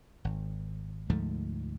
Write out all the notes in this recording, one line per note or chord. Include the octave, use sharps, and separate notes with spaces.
G#1
D2 G#2 F3 A3